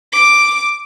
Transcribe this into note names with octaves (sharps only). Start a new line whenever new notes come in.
D6